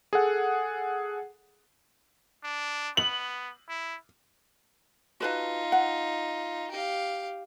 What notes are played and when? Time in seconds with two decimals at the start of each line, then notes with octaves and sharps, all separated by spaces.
0.13 G#4 A4 F#5
2.44 D4
2.97 B3 F#7
3.69 E4
5.20 D#4 F4 F#4 B4 A5
5.72 F#5
6.71 G4 F5